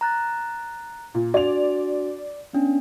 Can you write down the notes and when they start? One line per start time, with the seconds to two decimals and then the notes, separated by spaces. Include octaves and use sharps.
0.01 A#5 F#6 A6
1.14 A#2
1.34 D4 F#4 D5 F7
2.53 B3 C#4 D4